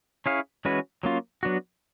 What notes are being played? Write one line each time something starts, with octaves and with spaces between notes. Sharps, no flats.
C#4 E4 G#4 C#5 F5
E3 G#3 C#4 F#4 B4
F#3 A#3 C#4 F4
F#3 B3 D4 F#4